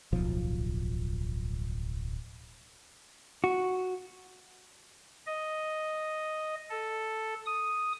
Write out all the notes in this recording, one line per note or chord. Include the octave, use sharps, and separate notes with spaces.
D1 B1 F3
F#4
D#5
A4
D#6